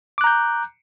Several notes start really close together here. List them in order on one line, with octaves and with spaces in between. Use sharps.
D6 F#6 A#5 G6